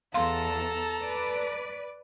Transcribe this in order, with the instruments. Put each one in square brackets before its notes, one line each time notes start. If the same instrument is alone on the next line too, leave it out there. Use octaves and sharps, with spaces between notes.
[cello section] E2 [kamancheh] A4 [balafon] F5 C6 [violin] A5 A#5
[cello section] B4 D5